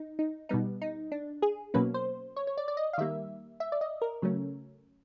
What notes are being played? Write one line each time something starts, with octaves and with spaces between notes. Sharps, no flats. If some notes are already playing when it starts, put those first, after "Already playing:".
Already playing: D#4
D#4
B2 G3 B3 D#4
D#4
D4
G#4
B2 F#3 A#3 C#4 B4
C5
C#5
C#5
D5
D5
D#5
F5
D#3 G3 A#3 E5
E5
D5
D#5
A#4
C#3 F#3 A3 C#4